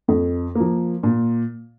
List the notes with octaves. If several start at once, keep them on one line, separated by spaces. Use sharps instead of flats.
F2
F3 A#3
A#2